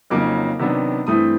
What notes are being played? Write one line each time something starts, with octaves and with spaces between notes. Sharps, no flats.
F2 C#3 F#3 A#3 D#4 D6
C3 D#3 F#3 B3 D4
G2 E3 A3 C4 E4 D#6